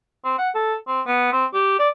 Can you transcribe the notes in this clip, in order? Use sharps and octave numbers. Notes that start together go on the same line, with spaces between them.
C4
F#5
A4
C4
B3
C4
G4
D5